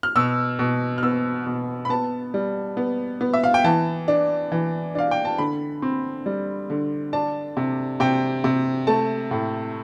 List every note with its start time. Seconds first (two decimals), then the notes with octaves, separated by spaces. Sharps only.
0.03 F6
0.16 B2 E6
0.59 B2
0.98 F6
1.03 B3 E6
1.46 B2
1.85 B5
1.89 B3 A5
2.34 G3
2.77 B3
3.21 B3
3.33 E5
3.44 F5
3.54 G5
3.64 E3 A5
4.08 D4
4.52 E3
4.95 D4 F5
5.11 G5
5.25 A5
5.38 D3 B5
5.82 C4
6.26 G3
6.70 D3
7.13 D4 A5
7.57 C3
8.00 C3 G5
8.44 C3
8.87 A3 A5
9.31 A2